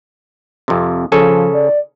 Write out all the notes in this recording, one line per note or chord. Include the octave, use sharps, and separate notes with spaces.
F2 C3
C#3 F3 A4 G#5
D5